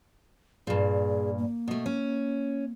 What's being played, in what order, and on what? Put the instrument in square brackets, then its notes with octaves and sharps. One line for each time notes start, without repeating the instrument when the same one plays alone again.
[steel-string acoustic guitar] G2 A#2 [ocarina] G#4
[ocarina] A#3
[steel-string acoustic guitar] B2 A3
C#4